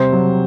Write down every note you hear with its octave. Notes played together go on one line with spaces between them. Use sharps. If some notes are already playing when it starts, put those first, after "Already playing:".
Already playing: C3 G3 C5
F#3